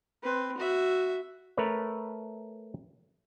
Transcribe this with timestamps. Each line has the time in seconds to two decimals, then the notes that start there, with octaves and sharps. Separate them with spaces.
0.23 C4 B4
0.57 F#4 E5
1.57 A3 A#4 B4 C#5